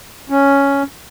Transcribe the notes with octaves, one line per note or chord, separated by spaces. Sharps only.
C#4